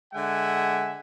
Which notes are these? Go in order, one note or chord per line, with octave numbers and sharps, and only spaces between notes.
D3 G#3 E5 F#5 G#5